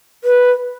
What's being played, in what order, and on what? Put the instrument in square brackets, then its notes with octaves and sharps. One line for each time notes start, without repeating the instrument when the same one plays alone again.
[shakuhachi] B4